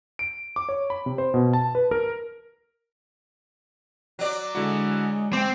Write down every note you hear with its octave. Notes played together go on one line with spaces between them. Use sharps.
D7
D6
C#5
B5
C3
C5
B2
A5
B4
A#4
F#3 D5
D3 G#3 E4 F#4
C4 G5 D6